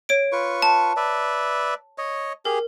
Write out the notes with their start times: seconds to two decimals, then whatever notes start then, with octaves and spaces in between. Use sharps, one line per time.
0.09 C#5 D7
0.32 F4 B4 C#6
0.62 A5
0.97 B4 D5 E5
1.98 C#5 D#5
2.45 G4 G#4 A#4